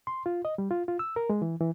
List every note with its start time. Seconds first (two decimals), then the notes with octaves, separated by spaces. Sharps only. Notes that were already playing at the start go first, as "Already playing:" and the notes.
0.07 C6
0.26 F4
0.45 D#5
0.58 G3
0.71 F4
0.88 F4
0.99 E6
1.16 A#4
1.30 G#3
1.42 E3
1.61 E3